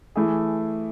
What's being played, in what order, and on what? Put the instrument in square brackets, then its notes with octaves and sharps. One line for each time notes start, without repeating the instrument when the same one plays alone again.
[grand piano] E3 A3 E4 G#4